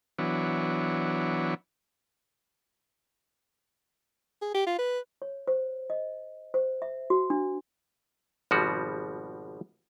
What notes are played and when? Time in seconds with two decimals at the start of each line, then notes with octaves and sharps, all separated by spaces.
0.19 E3 F#3 B3 D4 C#5
4.41 G#4
4.54 G4
4.66 F4
4.79 B4
5.22 C#5
5.47 C5
5.90 D#5
6.54 C5
6.82 E5
7.10 F#4
7.30 D4
8.51 G#1 B2 F3 G3 F#4